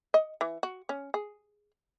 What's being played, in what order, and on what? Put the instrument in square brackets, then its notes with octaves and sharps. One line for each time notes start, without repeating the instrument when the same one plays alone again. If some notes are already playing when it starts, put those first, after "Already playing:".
[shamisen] D#5
E3
F#4
C#4
G#4